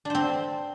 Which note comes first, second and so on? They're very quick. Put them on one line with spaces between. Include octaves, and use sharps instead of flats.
D4 C5 C4